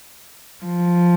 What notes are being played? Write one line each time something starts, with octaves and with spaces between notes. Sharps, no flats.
F3